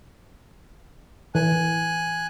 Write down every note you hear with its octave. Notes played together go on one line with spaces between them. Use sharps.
E3 G#5 F#6